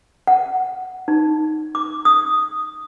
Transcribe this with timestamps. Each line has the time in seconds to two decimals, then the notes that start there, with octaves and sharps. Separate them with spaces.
0.27 F#5
1.08 D#4
1.75 D6
2.05 D#6